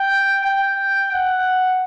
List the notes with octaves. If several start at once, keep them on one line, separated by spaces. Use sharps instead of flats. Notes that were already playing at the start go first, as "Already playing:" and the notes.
Already playing: G5
G5
F#5